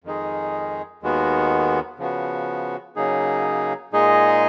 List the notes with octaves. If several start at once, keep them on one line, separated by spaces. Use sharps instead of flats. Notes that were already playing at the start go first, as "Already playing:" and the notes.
F2 D#3 G#3 D#4 G#4
D#2 D#3 G#3 B3 F#4
C#3 F3 B3 F#4
C#3 F#3 A#3 D#4 G#4
A#2 G#3 D#4 G#4 D#5